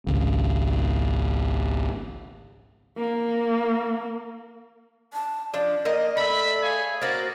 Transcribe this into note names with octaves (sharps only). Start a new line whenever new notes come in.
G#1 C#2
A#3
A5
F3 D4 D5
A#3 A#4 D#5
A3 D5 E5 B5
G#4 C#5 F5 G#5
A#3 F#4 C5 D5 D#5 F5